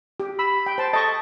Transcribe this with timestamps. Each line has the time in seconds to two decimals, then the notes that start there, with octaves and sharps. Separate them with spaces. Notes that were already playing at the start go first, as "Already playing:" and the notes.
0.20 G4
0.39 B5 E6
0.66 G5
0.78 C5 A5
0.93 A4 D#5 C#6